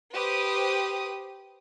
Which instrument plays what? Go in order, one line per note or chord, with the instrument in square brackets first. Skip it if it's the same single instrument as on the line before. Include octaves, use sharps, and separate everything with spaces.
[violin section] G4 B4 C5 D#6